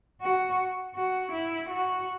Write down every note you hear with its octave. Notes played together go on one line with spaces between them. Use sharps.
F#4
F#4
E4
F#4